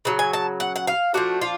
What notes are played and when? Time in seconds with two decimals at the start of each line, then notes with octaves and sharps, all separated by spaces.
0.05 C#3 F#3
0.19 G#5
0.33 A5
0.60 F#5
0.76 F#5
0.87 F5
1.14 F3 A3 D4 F#4
1.41 F4